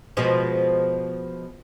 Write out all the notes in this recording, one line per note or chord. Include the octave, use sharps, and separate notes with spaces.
B2 F3 G#3